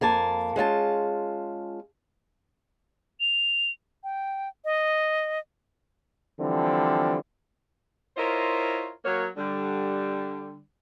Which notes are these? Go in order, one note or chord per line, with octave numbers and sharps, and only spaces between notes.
F2 A#3 G#5 A5
G#3 C#4 F4 A5
F7
G5
D#5
D3 E3 F3 G3 C4
E4 F4 A#4 C5 C#5 D#5
F#3 A#3 C#5
D3 G3